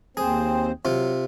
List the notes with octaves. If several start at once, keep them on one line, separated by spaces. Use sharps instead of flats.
D#2 C4 G#4 C5
C3 F#3 F4